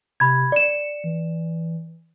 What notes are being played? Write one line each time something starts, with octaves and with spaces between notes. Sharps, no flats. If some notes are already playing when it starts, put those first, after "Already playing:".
C3 B5 G#6
D5 C#7 E7
E3